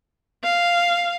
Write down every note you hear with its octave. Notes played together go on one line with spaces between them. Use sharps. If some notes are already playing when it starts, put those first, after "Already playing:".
F5